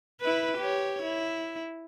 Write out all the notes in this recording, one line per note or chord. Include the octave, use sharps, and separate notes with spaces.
E4 B4
G4 C#5
E4